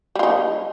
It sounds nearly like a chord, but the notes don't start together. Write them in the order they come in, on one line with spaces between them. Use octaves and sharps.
G3 F4 D#4